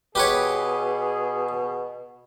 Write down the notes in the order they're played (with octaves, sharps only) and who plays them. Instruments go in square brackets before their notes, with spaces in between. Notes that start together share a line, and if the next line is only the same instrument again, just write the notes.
[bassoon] B2 [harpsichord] G4 B4 C#5 [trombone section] G#4